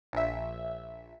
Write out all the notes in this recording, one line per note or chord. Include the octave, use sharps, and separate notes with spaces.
A#1 E5